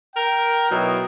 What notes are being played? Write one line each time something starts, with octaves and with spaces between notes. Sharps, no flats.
A#4 G5
B2 F#3 D#4 E4